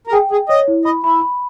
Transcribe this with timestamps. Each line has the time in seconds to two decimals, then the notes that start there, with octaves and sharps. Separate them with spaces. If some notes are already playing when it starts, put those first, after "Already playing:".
0.07 A#4
0.13 G#4 G5
0.31 G#4 G5
0.49 C#5 D#5
0.68 E4
0.85 D#5 B5
1.03 E4 B5
1.22 B5